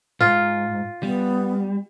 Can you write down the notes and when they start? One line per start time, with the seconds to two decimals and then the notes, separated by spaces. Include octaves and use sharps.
0.21 G#2 F4
1.03 G3 B3